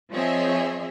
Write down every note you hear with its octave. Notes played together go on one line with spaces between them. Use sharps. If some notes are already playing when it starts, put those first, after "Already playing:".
F3 C4 G#4 C#5 D#5 E5